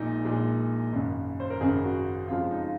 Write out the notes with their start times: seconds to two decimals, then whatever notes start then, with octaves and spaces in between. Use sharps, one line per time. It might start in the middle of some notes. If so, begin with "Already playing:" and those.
Already playing: A#1 A#2 G#3 D#4
0.25 A#1 A#2 G#3
0.93 G#1 F#2 C#3
1.40 C5
1.50 A#4
1.61 G#1 F#2 C#3 G#4
1.83 F#4
2.28 F2 C#3 F3 G#3 F4
2.51 D#4
2.63 F4